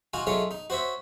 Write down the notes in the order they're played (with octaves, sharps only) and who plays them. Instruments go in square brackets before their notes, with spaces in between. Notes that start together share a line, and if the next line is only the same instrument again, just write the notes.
[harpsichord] D#4 F4 F#4 G#5
F#3 G#3 A3 D#4 F4 C#5
D#4
F#4 C5 C#5 E5